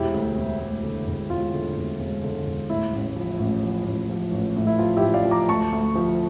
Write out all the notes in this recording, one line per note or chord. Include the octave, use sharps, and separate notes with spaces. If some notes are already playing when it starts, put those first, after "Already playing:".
Already playing: E1 E4 G4
D2
E1
D2
D3
E1
E1 F4
D3
E1
E1
D3
E1
A2 E4
A1
F3
A1
F3
A1
F3
A1
A2
E4
F3 F4
E4 G4
A1
D5 F5
F3
A#5 D6
D2 A5 C#6
D2
F3